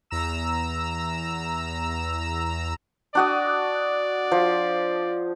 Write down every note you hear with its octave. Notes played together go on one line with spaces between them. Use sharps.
E2 A#5 E6
D4 F#4 D5 D#5
F3